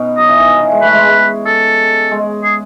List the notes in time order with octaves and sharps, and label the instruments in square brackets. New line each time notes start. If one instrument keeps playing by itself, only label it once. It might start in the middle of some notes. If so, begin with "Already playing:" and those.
Already playing: [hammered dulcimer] B2 B3 C#4 D#4
[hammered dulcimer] F#3 [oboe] D#5
[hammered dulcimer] E3
D#3
F#3
E3
G#3
[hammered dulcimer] A2 A3 [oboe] B4
[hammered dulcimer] G#3
G#3
[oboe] A4
[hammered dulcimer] G#3
[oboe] G#4